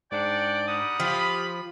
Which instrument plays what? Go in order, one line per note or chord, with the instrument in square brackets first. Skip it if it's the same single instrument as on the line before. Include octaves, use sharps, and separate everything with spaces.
[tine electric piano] G#2 D4 [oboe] D5 [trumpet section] F#5 G5
[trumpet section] G3 A#4 F#5 [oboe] D#6
[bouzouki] F3 [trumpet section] F4 B5 [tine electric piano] G4